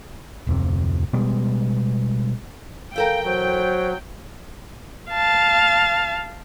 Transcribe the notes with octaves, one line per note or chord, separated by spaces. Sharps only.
D1 F2 C3
B2 G3 G#3 B3
E3 A4 A#4 F5 G5
F#3 C5
F5 A5